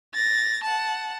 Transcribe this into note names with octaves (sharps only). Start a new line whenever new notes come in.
A6 A#6
F#5 A5